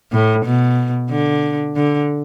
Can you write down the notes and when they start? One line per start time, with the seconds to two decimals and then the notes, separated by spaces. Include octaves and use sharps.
0.12 A2
0.45 B2
1.10 D3
1.76 D3